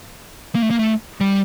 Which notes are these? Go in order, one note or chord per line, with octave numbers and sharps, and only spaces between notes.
A#3
A3
A#3
A3
G3